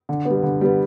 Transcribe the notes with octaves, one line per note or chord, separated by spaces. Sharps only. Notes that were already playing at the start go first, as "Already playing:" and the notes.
D3
B3
G3
D3
G3 B3